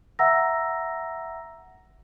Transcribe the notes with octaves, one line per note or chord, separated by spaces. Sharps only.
E5 F#5 A#5 E6 A#6